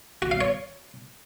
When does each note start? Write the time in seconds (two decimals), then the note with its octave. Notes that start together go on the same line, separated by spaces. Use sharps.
0.22 F#4
0.31 F5
0.41 C#5